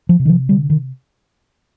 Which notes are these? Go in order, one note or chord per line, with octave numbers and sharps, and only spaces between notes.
F3
C3
D#3
F3
D3 G3
D#3